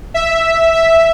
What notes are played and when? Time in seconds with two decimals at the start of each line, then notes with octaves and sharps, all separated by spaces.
0.14 E5
0.73 E5